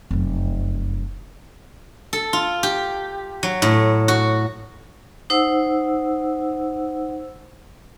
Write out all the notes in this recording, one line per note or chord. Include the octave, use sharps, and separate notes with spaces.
F1 F#2
A4
F4
G4
F#3
A2
F#4
D#4 C5 F#5 E6